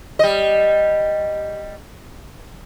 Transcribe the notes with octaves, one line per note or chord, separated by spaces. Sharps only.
G3 D#5